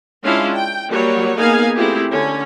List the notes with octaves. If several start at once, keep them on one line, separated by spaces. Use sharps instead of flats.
G#3 C#4 D4 E4 F4 F5
G5
F#3 G3 A#3 C#5
A#3 B3 D#4 G#4 F5 G#5
A3 C4 E4 F4 G4 G#4
D3 C#4